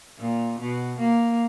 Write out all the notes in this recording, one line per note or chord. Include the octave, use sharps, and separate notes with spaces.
A#2
B2
A#3